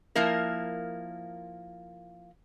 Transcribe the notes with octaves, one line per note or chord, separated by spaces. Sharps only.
F3 A#3 E4 A#4